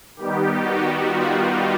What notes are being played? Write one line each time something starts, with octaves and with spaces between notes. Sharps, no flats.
D#3 G3 B3 D#4 G4
F#4
F4